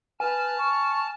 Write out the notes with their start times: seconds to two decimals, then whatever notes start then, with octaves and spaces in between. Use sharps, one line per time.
0.20 B4 G#5 A5 F6
0.58 C#6